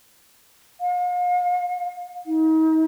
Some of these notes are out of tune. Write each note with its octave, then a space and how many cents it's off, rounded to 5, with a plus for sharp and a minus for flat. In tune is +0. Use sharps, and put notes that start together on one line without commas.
F5 +40
D#4 +35